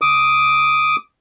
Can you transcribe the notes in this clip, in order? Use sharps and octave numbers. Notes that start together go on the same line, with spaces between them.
D6 D#6